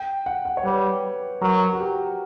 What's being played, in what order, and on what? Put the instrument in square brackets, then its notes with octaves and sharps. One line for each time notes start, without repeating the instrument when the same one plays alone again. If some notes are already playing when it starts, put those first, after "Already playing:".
Already playing: [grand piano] G5
F#5
F#5
C#5
[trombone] G3 [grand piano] B4
[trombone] F#3 [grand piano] A#4
[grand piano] F#4
G4